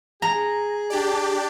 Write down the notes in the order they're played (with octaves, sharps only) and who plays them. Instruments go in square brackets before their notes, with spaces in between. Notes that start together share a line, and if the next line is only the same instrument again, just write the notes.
[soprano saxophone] G#4 [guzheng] A#5
[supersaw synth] D4 G4 D5